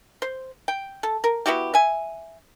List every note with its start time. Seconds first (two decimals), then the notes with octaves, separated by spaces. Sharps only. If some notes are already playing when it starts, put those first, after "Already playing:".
0.22 C5
0.68 G5
1.03 A4
1.24 A#4
1.46 B3 E4 F#4 G4
1.74 E5 G#5